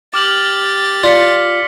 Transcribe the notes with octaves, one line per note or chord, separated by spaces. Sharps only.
G4 D6 F6 A6 F#7
F4 D5 F6 B6 C#7